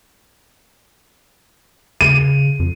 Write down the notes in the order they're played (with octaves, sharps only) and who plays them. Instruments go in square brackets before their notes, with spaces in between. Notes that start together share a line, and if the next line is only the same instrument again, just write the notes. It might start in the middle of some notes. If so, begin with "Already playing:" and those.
[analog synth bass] C#3 [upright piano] D#7
[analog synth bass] F2